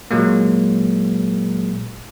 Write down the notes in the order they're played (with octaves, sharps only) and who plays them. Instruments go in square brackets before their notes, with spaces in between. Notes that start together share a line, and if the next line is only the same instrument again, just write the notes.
[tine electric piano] A#2 F#3 G#3 A#3